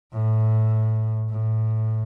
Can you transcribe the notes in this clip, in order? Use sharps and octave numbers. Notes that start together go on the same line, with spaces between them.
A2
A2